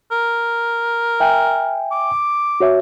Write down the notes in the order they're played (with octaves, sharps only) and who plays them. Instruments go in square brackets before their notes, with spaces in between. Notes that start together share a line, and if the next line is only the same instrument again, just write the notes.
[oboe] A#4
[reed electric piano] E5 G5 G#5
[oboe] D6
[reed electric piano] F#4 C#5 E5